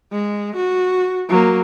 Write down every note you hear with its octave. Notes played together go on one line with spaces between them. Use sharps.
G#3
F#4
F#3 A#3